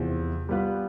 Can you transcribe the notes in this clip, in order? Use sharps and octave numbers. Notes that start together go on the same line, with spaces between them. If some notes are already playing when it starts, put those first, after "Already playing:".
Already playing: E2 C3 F3
G3 B3 F4 B4